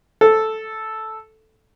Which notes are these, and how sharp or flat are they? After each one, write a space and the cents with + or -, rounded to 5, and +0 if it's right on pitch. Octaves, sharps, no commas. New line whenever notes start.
A4 -5